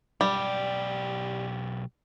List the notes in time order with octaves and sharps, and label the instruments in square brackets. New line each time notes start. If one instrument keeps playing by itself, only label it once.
[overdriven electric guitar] B1 G4 [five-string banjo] G3